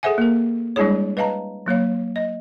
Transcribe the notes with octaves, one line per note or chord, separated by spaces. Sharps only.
G#4 A4 C5 E5 F#5 G#5
A#3 A#4
G3 G#3 D4 E4 G#4 C#5
B4 D#5 F5 A5 A#5
F#3 A#3 C#5 F5
D#5